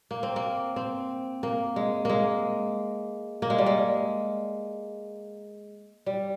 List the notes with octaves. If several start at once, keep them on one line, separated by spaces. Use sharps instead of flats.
A#3
C4
A#3
C4
A#3
G#3
G#3 A#3
A#3
G#3
G3
G#3
G3